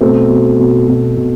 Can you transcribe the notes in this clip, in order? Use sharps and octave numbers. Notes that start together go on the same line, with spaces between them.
B2 A3 C4
B2
B2
B2
B2